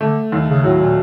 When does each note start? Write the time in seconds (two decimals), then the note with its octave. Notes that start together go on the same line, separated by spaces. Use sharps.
0.01 D3 A3
0.32 D#2
0.48 C#3
0.64 A2 F#3
0.80 A#2